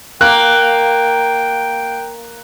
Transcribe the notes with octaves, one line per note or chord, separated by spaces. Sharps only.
A#3 G5 F#6